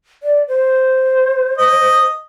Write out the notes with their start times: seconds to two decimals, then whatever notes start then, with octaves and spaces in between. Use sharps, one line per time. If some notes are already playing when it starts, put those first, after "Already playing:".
0.23 D5
0.48 C5
1.58 D#5